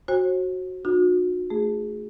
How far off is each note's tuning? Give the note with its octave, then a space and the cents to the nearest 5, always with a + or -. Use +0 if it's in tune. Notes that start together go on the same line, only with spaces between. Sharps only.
F#4 +0 C5 +45 G#5 -45
D4 +45 F#4 -40
A3 +0 G#4 +0